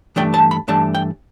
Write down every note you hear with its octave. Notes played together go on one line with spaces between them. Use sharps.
G2 E3 A3 D4 G5
A5
B5
G2 E3 A3 D4 A5
G5